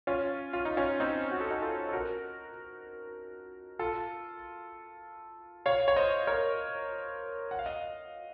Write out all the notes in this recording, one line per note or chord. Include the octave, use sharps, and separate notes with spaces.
C#4 F4
F4
D#4
C#4 F4
C4 D#4
F#4
A4
D#4 F#4
F4 A4
A4
F#4 A#4
F4 A4
C#5 F5
C#5
C5 D#5
A#4 C#5
F#5
F5
D#5